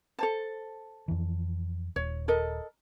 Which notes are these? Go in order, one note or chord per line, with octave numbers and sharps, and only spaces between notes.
A4 C5 A5
F2 E3
D#1 C#5
A4 A#4 D#5